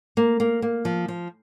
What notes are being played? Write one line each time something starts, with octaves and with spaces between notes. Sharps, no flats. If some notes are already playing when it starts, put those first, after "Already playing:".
A#3
A#3
A#3
F3
F3